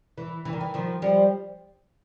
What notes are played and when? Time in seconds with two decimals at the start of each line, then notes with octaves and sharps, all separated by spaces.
0.18 E3
0.45 E3
0.53 D#3
0.61 E3
0.74 D#3 F3
1.02 F3 G3